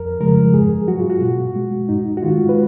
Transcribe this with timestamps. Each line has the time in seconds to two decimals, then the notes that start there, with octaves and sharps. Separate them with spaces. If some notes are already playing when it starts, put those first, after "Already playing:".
Already playing: F2 A#4
0.21 C#3 F3 G#3 A#4
0.54 G#2 G#4
0.88 F#3 F#4
0.99 F4
1.10 F#4
1.21 B2
1.55 G#3
1.89 G#2 D#4
2.17 F#4
2.22 D#3 G#3 F4
2.49 B4